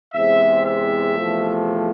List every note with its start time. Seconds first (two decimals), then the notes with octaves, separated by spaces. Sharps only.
0.14 E2 C3 G#3 C4 E5
0.64 E5
1.15 E2 C3 F3 A3